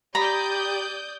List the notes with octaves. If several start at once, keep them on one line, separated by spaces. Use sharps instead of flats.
G4 D5 A#5 B5 D#6 G6